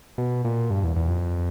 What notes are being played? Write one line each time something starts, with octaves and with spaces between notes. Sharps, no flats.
B2
A#2
G2
E2
E2
F2